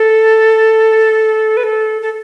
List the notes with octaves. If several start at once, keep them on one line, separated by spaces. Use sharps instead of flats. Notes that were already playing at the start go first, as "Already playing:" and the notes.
Already playing: A4
B4
A4
A4